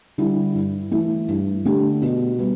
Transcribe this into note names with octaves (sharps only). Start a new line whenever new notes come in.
D3 G3 E4 G4
G2
E3 A3 E4
G2
D3 A3 D4 G4
B2
G3 B3